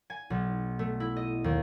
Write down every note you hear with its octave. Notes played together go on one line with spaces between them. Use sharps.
G#5
B1
A3
E4
D#5
D#2